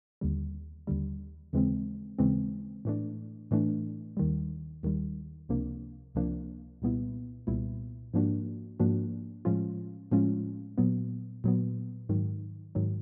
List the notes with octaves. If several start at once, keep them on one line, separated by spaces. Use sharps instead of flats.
D#2 D3 G3
D#2 D3 G3
D#2 C#3 E3 G#3 C4
D#2 C#3 E3 G#3 C4
A2 E3 A3 D4
A2 E3 A3 D4
D#2 D#3 G3
D#2 D#3 G3
C#2 C3 F3 A#3 D4
C#2 C3 F3 A#3 D4
C2 A#2 G3 B3 E4
C2 A#2 G3 B3 E4
G#2 F3 A#3 D4 F#4
G#2 F3 A#3 D4 F#4
A2 F3 G#3 C#4 F4
A2 F3 G#3 C#4 F4
A#2 F#3 B3
A#2 F#3 B3
G#2 D#3 F#3
G#2 D#3 F#3